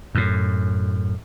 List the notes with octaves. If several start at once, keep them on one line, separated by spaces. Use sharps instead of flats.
F#2 A2